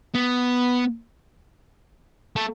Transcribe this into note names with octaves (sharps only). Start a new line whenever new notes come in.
B3
A3